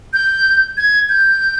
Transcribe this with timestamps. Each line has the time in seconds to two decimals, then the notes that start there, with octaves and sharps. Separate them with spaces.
0.13 G6
0.77 G#6
1.09 G6